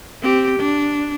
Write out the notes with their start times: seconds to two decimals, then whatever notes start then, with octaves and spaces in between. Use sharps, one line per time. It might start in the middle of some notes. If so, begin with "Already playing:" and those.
0.22 C4 G4
0.59 D4